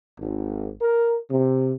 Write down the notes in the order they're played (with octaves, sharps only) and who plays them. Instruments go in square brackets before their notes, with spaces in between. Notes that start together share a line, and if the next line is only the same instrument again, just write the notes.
[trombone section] G#1
A#4
C3